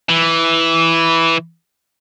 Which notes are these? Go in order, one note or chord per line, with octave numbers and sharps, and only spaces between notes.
E3